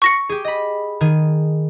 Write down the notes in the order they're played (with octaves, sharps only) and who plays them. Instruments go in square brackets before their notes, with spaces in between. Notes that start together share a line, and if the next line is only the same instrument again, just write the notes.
[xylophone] C#6 A#6 C#7
[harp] G4 G#4
D#5 B5
D#3 G#4